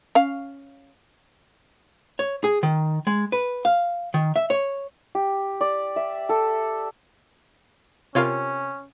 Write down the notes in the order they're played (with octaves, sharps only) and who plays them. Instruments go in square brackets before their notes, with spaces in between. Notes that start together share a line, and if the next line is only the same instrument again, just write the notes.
[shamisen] C#4 F5
[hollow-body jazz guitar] C#5
G#4
D#3
G#3
B4
F5
D#3
E5
C#5
[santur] G4
D5
E5
A4
[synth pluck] C3 F4 [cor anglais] C#4 [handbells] A#4 C#5